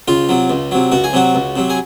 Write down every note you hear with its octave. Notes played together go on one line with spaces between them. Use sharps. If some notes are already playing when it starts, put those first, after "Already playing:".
C#2 F4
C3 F#3
C#2
C3 F#3
C#2 F#4
G#4
C3 F#3 F#4
C#2
C3 F#3
G#4